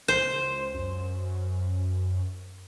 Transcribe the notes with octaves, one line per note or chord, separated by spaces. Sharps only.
C#2 C5
F#2